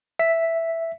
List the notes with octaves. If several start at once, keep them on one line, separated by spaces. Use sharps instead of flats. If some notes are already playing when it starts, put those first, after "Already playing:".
E5 B6